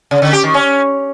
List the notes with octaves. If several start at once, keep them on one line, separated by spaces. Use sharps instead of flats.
C#3
D3
G4
D#3
C#4